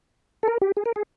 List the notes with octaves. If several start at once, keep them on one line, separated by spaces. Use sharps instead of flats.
A4
A#4
G4
G#4
A#4
G#4